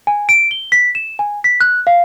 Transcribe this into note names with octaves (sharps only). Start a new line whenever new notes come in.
G#5
D7
G7
B6
E7
G#5
B6
F#6
F5